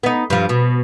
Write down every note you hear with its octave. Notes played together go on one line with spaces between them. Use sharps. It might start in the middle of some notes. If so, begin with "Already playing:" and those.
B3 D#4
G2 F3
B2